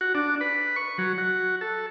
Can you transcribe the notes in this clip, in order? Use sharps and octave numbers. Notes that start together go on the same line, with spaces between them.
F#4
D4
B4
C#6
F#3
F#4
A4